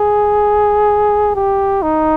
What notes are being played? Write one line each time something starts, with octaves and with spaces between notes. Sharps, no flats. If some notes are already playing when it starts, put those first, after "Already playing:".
Already playing: G#4
G4
D#4